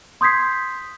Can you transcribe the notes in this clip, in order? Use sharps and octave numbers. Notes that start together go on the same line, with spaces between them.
C6 D#6 G6 G#6 B6 C7